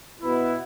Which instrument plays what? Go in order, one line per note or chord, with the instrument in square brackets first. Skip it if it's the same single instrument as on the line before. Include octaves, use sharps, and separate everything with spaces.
[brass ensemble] B2 B3 E4